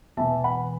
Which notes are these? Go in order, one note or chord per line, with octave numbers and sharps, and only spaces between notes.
E1 E2 E3 B3 E5 A5
F#5 B5